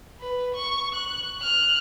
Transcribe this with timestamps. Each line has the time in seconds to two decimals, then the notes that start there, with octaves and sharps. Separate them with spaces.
0.20 B4
0.54 C#6
0.94 F#6
1.39 F6 F#6